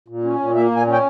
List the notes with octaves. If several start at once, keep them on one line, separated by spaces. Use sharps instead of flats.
A#2
C#4
A#2
A#3 E5
A#2
G#5
C#4
G5